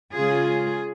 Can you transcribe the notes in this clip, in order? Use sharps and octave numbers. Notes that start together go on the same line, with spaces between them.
C#3 G#3 F4 G#4